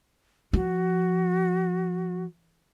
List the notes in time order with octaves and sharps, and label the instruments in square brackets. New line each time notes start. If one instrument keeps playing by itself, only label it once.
[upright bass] F3 [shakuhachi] F#4